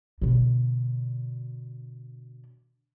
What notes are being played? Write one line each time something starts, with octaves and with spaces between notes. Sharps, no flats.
B2 D3